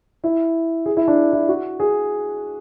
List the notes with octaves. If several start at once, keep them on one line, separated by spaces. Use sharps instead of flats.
E4
G#4
E4
D4
E4
F#4
G#4